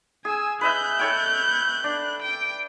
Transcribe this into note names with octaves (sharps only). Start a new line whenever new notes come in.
G#4 G#5 E6
B4 D#5 E5 F#6 G6
A4 C#5 G5
D4
G5